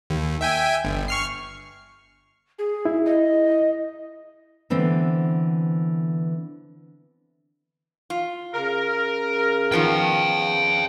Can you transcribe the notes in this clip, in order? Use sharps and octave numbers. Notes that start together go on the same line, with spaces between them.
D#2
E5 G5 G#5
G1
C#6 F6 C7
G#4
E4
D#5
D3 E3 B3 C4
F4
C#3 A#4
D#3 F3 B3 F5 G5